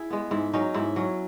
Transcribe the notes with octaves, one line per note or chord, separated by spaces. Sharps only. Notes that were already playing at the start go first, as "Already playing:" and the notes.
Already playing: E4 G#4
G#3 B3
G#2 E4
F#3 C#4 D#4
G#2 E4
F#3 C#4